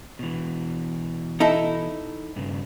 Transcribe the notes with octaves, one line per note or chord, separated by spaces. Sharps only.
B2 E3
D#4 E4 A4
G2 C#3